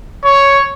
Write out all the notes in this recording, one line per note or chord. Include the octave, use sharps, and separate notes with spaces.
C#5